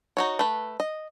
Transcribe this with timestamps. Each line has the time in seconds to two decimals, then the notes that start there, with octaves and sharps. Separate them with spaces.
0.17 D#4 F#4 C#5
0.39 A3 B4
0.80 D#5